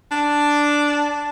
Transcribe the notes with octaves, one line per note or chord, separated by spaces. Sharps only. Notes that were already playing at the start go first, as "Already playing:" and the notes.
D4